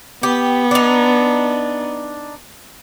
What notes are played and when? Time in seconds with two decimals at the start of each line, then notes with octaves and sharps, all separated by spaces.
0.23 B3 G4
0.71 D4 D#4